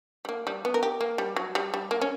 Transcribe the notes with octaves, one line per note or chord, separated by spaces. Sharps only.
G3
A#3
G3
B3
A#4
G4
A#3
G3
F#3
G3
G3
A#3
C#4